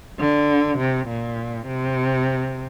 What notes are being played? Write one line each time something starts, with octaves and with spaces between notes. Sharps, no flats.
D3
C3
A#2
C3